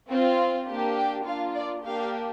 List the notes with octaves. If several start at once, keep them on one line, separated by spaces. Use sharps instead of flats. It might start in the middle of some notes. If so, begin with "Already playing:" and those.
C4 F4
A#3 D4 G4
G5
A#3 D4 F4 F5
D5
A#3 D4 G4 F5